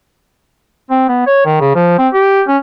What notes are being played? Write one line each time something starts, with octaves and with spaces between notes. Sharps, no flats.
C4
B3
C#5
D#3
C#3
F3
C4
G4
C#4